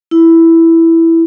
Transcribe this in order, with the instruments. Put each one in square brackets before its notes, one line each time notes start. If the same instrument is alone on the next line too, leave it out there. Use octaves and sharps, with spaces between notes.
[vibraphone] E4